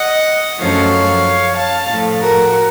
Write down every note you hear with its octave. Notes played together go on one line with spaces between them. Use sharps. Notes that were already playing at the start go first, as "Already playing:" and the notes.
Already playing: D#5 F#5
F#2 F3 A3 C#5 F5
F5 A5
A2 F3 A3
F#4 A#4